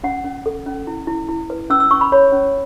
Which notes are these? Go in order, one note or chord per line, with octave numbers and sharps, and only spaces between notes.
C#4 F#5
C#4
A4
C#4
E4
E4
E4
B4
C#4 E6
E6
C#4 C#6
B5
C#5 B5
C#4